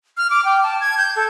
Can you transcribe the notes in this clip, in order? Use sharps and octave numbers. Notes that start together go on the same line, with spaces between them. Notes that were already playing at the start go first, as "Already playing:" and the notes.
F6
D6
G5
A5
G#6
G6
A4